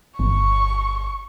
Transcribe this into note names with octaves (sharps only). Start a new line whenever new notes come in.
G1 C#6